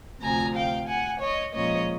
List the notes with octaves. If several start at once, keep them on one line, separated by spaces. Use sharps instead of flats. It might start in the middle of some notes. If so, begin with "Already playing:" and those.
D2 C3 F3 G#5 A#5
F5 G5
F#5 G#5
C#5 D#5
A#2 F3 G#3 C#4 C#5 D#5